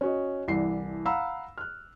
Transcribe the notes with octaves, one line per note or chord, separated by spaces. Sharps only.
C#4 F#4 D#5
C2 E3 D5 C7
F5 F#5 A#5 B5 E6
F6 F#6